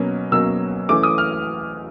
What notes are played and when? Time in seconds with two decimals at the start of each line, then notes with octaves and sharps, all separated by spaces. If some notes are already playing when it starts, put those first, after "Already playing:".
Already playing: B2 F#3 A#3 C#4
0.32 B2 F#3 A#3 C#4 E6
0.89 E3 A3 C#4 D6
1.03 D#6
1.18 F6